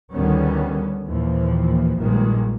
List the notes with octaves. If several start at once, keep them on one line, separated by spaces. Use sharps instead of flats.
D2 D3 D#3 G3 B3 C#4
D#2 A#2 E3 F3
A#1 G2 A#2 D#3 G#3